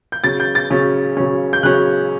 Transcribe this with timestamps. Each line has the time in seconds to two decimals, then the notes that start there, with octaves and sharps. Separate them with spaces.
0.12 G6
0.24 C#3 F#3 C#4 A6
0.40 G6
0.55 A6
0.70 C#3 F#3 C#4
1.17 C#3 F#3 C#4
1.53 G6
1.63 C#3 F#3 C#4 F#6